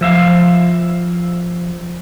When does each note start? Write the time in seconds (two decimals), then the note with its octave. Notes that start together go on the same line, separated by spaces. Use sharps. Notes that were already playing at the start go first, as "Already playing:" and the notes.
0.01 F3 E5 F5